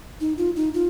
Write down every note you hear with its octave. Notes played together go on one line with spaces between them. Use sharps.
D#4
F4
D#4
F4